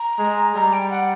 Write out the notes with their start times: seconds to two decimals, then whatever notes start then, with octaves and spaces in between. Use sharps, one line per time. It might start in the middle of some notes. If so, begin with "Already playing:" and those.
Already playing: A#5
0.18 G#3
0.55 G3 A#5
0.73 G5
0.91 F#5